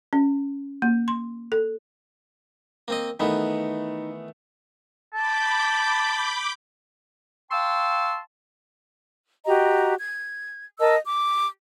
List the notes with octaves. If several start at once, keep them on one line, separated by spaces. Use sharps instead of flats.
C#4
A#3
C6
A4
A#3 C4 D#5
D#3 E3 A3 B3 D#4 E5
A5 B5 D6 G6
F5 G5 A5 C6 C#6 E6
F#4 G4 D#5 A#5
G#6
A#4 D#5 A5 E6
D6